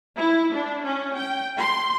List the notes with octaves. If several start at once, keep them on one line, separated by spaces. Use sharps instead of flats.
E4
D4
C#4
G5
C6